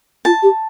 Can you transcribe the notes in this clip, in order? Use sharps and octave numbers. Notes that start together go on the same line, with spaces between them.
F4 A5
G4